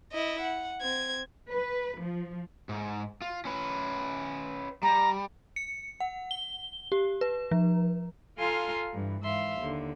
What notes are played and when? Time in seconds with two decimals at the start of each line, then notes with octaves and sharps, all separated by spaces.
0.12 E4 D#5
0.40 F#5
0.82 C4 G#6
1.49 B4
2.00 F3
2.69 G#2
3.22 F4
3.45 C#4 B4
4.83 G3 A#5
5.56 C#7
6.00 F#5
6.31 G7
6.92 G4
7.21 B4
7.51 F3
8.38 F4 A4 F5 G#5 A#5 C6
8.93 G2 E3
9.23 G#2 E3 E5 F5 C6
9.59 D#2 D3